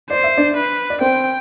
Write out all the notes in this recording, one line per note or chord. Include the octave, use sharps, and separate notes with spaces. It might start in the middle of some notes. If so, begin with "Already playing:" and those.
C5 D5
E5
D4 D5
B4
D5
C4 C5 G5